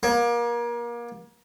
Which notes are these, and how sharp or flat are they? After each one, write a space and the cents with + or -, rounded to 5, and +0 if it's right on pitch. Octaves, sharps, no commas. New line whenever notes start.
A#3 +30